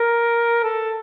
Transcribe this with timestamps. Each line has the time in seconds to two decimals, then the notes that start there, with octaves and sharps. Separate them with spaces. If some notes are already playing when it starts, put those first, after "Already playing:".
Already playing: A#4
0.63 A4